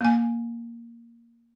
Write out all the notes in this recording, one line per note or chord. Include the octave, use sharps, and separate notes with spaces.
A#3 G#5